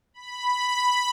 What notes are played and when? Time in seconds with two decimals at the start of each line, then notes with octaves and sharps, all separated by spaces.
0.14 B5